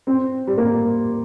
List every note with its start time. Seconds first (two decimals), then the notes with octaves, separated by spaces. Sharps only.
0.07 C4
0.47 G3
0.58 A#3